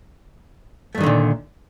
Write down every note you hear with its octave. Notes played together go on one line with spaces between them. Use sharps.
G2 A#2 D3 D#3 A3